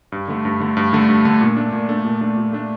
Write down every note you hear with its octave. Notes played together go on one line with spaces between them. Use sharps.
G2
D3 A3
G2
D3 A3
G2
D3 A3
G2
D3 A3
A#2
A3 D4
A#2
A3 D4
A#2
A3 D4
A#2
A3 D4